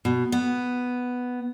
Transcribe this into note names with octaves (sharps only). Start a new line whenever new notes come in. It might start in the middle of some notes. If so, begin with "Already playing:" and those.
B2
B3